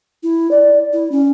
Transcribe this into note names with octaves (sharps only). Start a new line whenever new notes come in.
E4
D5
E4
C#4